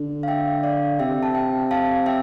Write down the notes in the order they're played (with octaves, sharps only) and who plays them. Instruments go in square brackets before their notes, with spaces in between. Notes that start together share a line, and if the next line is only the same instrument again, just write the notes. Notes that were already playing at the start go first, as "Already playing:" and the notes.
Already playing: [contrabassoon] D3
[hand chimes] F5
E5 G5
D5 F5
[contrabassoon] C3 [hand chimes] E5 G5
[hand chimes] A5
E5 G5
F5 A5
E5 G5